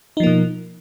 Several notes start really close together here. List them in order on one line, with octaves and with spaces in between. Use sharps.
D#4 F3 A#3 B2